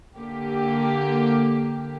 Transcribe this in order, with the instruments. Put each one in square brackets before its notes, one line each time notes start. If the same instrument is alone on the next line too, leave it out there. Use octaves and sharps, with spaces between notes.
[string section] D3 A#3 G4